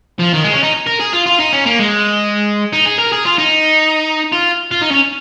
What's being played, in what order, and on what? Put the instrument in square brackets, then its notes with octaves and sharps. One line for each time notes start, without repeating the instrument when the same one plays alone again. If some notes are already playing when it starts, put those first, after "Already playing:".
[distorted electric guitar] F3
D#3
G#3
C#4
D#4
A#4
G#4
F4
F4
D#4
C#4
A#3
G#3
D#4
G#4
A#4
G#4
F4
D#4
F4
F4
D#4
C#4